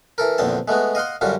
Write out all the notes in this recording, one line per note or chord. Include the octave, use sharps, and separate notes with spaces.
E3 A4 A#4
A#1 E2 D3 C4 A5
G#3 A3 B3 F#4
D#5 F5 F#5 C6
F#2 D3 G3 F4 F#4